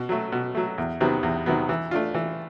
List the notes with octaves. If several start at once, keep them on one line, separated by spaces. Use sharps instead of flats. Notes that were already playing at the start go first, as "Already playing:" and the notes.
Already playing: B2
F#3 A3
B2
F#3 A3
E2
C3 D#3 F#3 B3
E2
C3 D#3 F#3 B3
E3
A3 D4 F4
E3